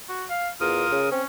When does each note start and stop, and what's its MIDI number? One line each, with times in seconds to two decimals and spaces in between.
0.09 0.25 66
0.30 0.49 77
0.61 0.85 40
0.61 1.01 65
0.61 1.09 70
0.61 1.09 87
0.91 1.09 49
1.11 1.22 60
1.11 1.26 61